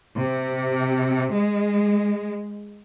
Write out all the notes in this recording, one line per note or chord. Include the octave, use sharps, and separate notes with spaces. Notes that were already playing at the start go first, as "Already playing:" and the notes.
C3
G#3